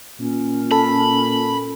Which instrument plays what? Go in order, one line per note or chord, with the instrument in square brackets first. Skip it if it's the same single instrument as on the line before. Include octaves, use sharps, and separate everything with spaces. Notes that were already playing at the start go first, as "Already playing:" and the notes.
[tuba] A#2 [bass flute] C#4
[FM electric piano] A4 [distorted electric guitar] B5